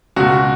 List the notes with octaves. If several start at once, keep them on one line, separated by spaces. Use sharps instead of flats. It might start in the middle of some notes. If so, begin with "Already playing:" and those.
C#2 B2 F#4